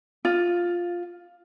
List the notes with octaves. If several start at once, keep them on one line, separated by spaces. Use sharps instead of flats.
F4